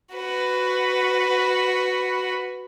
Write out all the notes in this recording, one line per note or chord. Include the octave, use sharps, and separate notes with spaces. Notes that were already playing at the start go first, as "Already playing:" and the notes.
F#4 B4